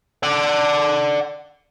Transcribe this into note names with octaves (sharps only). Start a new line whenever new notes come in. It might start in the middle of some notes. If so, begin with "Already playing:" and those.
D5 F#5